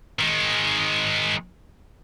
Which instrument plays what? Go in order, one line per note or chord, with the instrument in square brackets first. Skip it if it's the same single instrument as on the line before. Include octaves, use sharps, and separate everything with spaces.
[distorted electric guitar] D#3 G#3